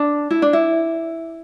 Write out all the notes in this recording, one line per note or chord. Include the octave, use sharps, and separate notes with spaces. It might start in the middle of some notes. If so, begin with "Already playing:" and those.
Already playing: D4
E4
D4
E4